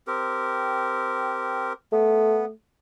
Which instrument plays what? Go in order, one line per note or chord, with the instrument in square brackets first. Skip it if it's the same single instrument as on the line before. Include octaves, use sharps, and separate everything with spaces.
[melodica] C4 G4 A#4
[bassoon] A3 [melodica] B3